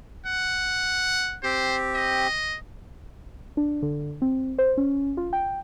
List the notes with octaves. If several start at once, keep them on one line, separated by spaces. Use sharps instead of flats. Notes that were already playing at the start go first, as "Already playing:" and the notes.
F#5
C4 G4 C5
D#5
D4
D3
C4
C5
C#4
F4
G5